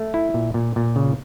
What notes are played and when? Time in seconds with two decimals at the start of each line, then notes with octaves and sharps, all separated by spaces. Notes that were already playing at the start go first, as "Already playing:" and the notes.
Already playing: A3
0.14 E4
0.34 A#2
0.54 A#2
0.76 A#2
0.96 C#3